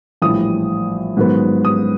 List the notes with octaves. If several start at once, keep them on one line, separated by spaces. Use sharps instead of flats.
A#1 A2 E3 G3 D#6
G#2 D#3 F#3 B3
D#6